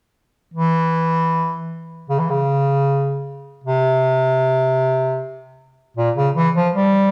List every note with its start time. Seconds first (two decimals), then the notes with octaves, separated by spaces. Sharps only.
0.54 E3
2.10 C#3
2.19 E3
2.30 C#3
3.64 C3
5.97 A#2
6.16 C#3
6.36 E3
6.55 F3
6.75 G3